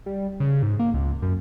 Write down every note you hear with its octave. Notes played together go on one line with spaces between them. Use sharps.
G3
C#3
G#2
A#3
C#2
F#2